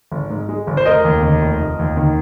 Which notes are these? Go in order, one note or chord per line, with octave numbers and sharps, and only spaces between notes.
G#1
G#2
G#3
G#1
C5
F1 A#4 D#5
D#2
D#3
F1
F1
D#2
D#3